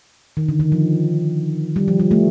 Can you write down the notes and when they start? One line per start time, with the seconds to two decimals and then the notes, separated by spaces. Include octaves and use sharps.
0.37 D#3
0.49 D3
0.60 D#3
0.72 F3
1.76 G3
1.88 F3
2.00 G3
2.11 A3